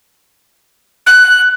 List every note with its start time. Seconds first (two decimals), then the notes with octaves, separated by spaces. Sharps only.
1.06 F#6